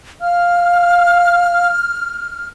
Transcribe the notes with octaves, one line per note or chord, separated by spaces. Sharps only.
F5 F6